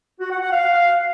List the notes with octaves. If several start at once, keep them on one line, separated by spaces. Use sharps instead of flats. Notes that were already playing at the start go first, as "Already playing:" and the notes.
F#4
F#5
F#5
F5